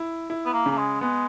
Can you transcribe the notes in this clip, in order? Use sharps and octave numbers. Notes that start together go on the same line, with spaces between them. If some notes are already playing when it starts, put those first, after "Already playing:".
Already playing: E4
E4
B3
A#3
C#3
A#3
G#3
G#3 B3